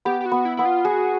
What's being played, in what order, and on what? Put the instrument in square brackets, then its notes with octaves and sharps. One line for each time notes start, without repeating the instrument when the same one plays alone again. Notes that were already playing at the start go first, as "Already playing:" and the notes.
[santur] B3 [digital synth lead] G4
[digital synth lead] G4
F#4
[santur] B3
[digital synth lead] E4
[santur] B3 [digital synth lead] E4
[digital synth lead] F4
[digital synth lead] F#4 [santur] G#4